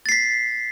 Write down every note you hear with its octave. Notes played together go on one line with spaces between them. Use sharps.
A6 B6 C7